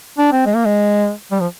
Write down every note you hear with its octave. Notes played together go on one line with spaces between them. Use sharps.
D4
C4
G#3
A#3
G#3
G3
F3